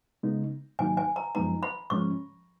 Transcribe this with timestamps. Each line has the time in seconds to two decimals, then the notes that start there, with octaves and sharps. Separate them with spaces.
0.23 C#3 G#3 B3 D#4
0.79 G#2 D#3 F#3 A#3 D#4 G#5
0.97 G#5
1.16 A#5
1.35 F#2 F3 G#3 B3 D#4 A#5
1.63 B5
1.90 G#2 F3 G#3 C#4 C#6